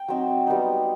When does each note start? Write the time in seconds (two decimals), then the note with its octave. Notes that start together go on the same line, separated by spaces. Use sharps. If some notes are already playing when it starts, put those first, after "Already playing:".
Already playing: G5
0.08 F#3 C4 D#4
0.47 G3 B3 D#4